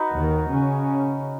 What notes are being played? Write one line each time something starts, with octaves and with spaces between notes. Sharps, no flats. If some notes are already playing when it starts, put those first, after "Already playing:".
Already playing: D#4 F#4 B4
D#2 D#3
C#3 C#4